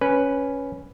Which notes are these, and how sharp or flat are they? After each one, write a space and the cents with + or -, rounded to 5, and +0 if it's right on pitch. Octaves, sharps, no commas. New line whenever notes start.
C#4 +0 B4 +0